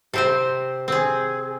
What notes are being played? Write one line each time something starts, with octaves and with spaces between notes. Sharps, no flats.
C3 C4 C5
C4 G#4